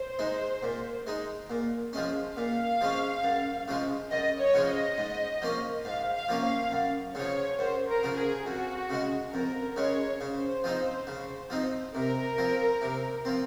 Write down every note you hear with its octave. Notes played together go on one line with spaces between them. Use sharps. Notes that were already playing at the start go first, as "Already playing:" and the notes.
Already playing: C5
G#3 D#4
A#2
G#3 D#4
A#2
F3 G#3 C#4
A#2 F5
F3 G#3 C#4
F#2
C#3 F3 G#3
F#2 D#5
C#5
C#3 F3 G#3
D#5
G#2
F3 A#3 C#4
G#2 F5
F5
F3 A#3 C#4
F5
F#2
C#3 F3 C#5
F#2 C5
A#4
C#3 F3
G#4
F2 F#4
C#3 G#3
F2 A#4
C#3 G#3 C#5
C#3 C5
F3 C4 D#4
C#3
F3 C4 D#4
C3 A#4
F3 C4
C3
F3 C4